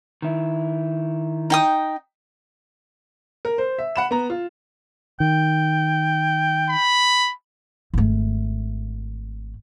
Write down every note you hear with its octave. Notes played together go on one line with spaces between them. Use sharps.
D#3 E4
D#4 G5 D#6
A#4
C5
E5
F#5 B5 E7
B3 A#5
F4
D#3 G5
B5
G#1 A3